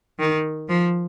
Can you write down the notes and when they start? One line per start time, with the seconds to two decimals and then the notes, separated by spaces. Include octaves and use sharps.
0.19 D#3
0.68 F3